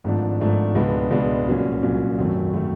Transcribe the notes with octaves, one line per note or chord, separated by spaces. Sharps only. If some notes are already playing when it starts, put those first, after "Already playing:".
G#1 G#2 F3 A3 D4
G#1 G#2 F3 A3 D4
C#2 B2 G#3 B3 D4
C#2 B2 G#3 B3 D4
C2 A#2 F#3 A#3 C#4
C2 A#2 F#3 A#3 C#4
G#1 F#2 D#3 F#3 A3
D#3 F#3 A3